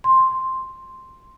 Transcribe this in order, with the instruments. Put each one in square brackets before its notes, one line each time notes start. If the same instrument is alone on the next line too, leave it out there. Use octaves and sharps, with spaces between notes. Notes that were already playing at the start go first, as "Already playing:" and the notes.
[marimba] C6